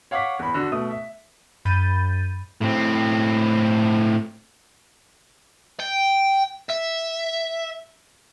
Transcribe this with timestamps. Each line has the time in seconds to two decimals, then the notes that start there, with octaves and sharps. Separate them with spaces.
0.11 C#5 F5 F#5 C#6 D6 B6
0.39 E2 B5
0.54 D3 F#4
0.72 B2 A3 D#6
0.90 E5
1.65 F#2 B5 G6 A6 D#7
2.61 A2 C4
5.80 G5
6.70 E5